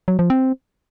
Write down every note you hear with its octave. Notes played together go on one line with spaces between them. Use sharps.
F#3
F3
C4